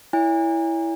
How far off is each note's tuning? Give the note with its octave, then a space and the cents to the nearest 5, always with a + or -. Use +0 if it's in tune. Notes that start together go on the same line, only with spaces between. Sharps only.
E4 +0 C#5 +40 G#5 -35